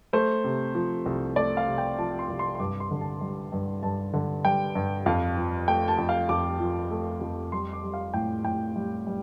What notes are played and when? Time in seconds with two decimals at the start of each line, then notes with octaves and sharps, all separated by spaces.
0.13 A3 C5
0.44 C3
0.75 F3
1.06 C2
1.36 A3 D5
1.57 F5
1.67 C3
1.78 G5
1.98 F3 A5
2.19 C6
2.29 C2
2.39 C6
2.55 C6
2.60 G2 D6
2.80 C6
2.91 D3
3.01 A5
3.21 G3
3.52 G2
3.83 G2 A5
4.13 D3
4.44 G3 G5
4.75 G2
5.06 F2 F5
5.37 F3
5.68 A3 G5
5.88 A5
5.98 F2
6.09 F5
6.29 F2 D6
6.60 F3
6.91 A3
7.21 F2
7.52 G3 C6
7.73 D6
7.83 G3
7.94 F5
8.14 A2 G5
8.44 A2 G5
8.76 G3
9.07 G3